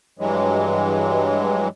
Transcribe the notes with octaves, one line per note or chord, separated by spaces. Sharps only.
G2 E3 F#3 G#3